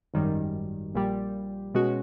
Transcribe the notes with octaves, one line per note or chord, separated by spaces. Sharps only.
G#1 F#2 D#3 G3
A#1 A#2 G3
B2 G#3 C#4 F#4